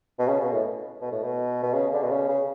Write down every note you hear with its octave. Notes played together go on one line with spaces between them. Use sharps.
B2
C#3
B2
A2
B2
A2
B2
B2
C#3
D3
B2
C#3
C#3